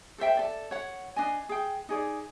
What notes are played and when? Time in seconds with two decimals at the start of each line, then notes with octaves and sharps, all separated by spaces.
0.18 A4 C5 E5 G5
0.37 A4 D5
0.71 C#5 F#5
1.16 D4 D#5 G#5
1.49 G#4 G5
1.89 D#4 G#4 D5